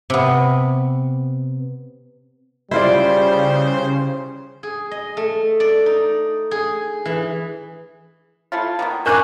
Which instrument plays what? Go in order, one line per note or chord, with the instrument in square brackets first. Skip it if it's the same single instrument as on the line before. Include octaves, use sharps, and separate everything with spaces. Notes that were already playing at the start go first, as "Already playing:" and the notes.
[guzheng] C3 B3
[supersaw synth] C#3 [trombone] G3 [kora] E4 F4 D5 [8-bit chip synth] C5
[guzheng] G#4
D#5
A3
D5
D#4
G#4
E3
[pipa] A3 E4 F4
D#3 A#3 B3
[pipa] D#4 G#4 [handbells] A#4 C#6 [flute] G#5 [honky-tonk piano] D6 F#6 G6